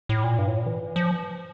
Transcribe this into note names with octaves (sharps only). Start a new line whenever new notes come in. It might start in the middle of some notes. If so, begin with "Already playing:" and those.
A2
A#2
G2
A2
A#2
E3
F3